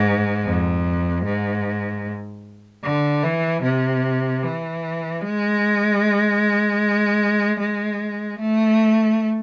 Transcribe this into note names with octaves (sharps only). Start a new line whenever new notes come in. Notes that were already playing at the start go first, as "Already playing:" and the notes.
Already playing: G#2
F2
G#2
D3
E3
C3
E3
G#3
G#3
A3